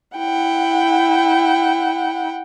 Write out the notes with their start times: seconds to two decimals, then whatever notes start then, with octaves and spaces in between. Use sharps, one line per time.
0.17 E4 F#5 G5